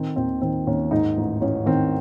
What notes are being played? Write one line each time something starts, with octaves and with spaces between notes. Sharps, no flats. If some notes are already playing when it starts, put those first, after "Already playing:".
Already playing: D#3 C4
D#2 C4
D#3 C4
D#2 C#4
G#2 D#4
A1
A1 C#4
D#3 C4